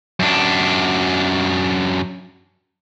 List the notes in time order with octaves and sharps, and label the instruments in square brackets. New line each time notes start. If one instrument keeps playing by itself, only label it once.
[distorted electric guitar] F#2 D4